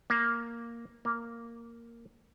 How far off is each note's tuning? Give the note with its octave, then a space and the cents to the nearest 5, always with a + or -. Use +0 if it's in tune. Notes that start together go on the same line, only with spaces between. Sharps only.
A#3 +0
A#3 -5